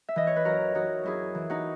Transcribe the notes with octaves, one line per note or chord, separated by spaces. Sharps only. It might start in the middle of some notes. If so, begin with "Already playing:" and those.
E5
E3 D#5
C#5
B4
F#2 F#4 A#4
E3 D#4 F#4
F#2 E4 G#4
E3
D#4 F#4